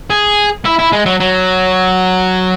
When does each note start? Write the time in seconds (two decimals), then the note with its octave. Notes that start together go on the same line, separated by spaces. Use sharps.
0.10 G#4
0.65 E4
0.79 E4
0.93 G#3
1.06 F#3
1.20 F#3